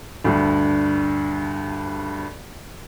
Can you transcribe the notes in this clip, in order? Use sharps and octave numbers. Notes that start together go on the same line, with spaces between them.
D2 G2